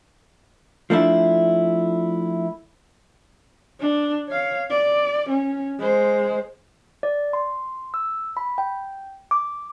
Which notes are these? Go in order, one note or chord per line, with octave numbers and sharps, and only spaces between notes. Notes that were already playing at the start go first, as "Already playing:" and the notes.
F3 A3 D4 E4
D4
C#5 F5
D5
C#4
G#3 C5
D5
C6
E6
B5
G5
D6